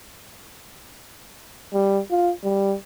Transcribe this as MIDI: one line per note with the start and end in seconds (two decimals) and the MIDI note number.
1.74 2.00 55
2.10 2.32 65
2.44 2.75 55